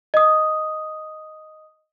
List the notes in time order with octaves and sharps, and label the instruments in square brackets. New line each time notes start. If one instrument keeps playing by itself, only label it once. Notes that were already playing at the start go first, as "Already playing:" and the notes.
[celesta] D#5 D#6